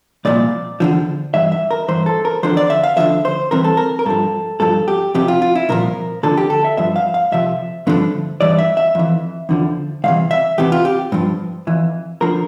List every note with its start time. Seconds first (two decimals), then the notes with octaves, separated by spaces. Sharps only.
0.25 C2 A#2 F3 D5
0.80 E2 D3 F3
1.34 G2 E3 E5
1.52 E5
1.71 A#4
1.88 G2 E3 C5
2.06 A4
2.25 A#4
2.43 E2 D3 F3 C5
2.57 D5
2.70 E5
2.84 F5
2.97 D2 D3 F3 E5
3.25 C5
3.51 C2 C3 E3 A#4
3.65 A4
3.77 A#4
3.99 A#4
4.06 G2 F3 A4
4.60 G2 F3 A4
4.88 G4
5.14 F2 C3 F3 G4
5.28 F4
5.42 F4
5.55 E4
5.69 C2 A#2 F3 A#4
6.23 D2 D3 F3 A4
6.37 G4
6.50 A4
6.64 E5
6.77 G2 F3 E5
6.96 F5
7.14 F5
7.32 F2 C3 F3 E5
7.87 G2 D3 F3
8.41 G2 E3 D5
8.58 E5
8.77 E5
8.95 F2 E3
9.49 E2 D3 F3
10.04 C2 C3 E3 F5
10.31 E5
10.58 E2 C3 E3 G4
10.72 F4
10.85 G4
11.12 G2 F3
11.67 F2 E3
12.21 D2 D3 F3 A#4